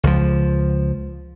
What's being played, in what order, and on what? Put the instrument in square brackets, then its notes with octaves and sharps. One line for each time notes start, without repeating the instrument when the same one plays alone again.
[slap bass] C#2 F3